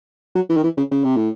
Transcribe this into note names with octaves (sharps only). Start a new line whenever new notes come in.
F#3
E3
D#3
E3
C#3
C#3
C3
A2